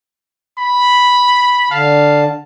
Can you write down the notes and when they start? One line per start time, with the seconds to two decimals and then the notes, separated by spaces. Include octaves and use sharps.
0.58 B5
1.71 D3 F5 A5